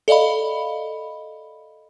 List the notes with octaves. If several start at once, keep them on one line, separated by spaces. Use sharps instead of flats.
A4 D5 D#5 F5 B5